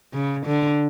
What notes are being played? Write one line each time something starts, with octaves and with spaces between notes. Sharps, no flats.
C#3
D3